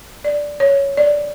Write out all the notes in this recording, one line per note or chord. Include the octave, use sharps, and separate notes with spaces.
D5
C#5
D5